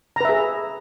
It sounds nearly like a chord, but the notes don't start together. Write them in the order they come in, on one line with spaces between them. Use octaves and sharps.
A#5 B4 E5 G#4